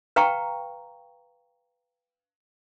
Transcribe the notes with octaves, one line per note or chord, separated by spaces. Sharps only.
B4 F5 G5 A#5 C#6